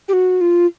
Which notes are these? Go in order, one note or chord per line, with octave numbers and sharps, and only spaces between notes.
G4
F#4
F4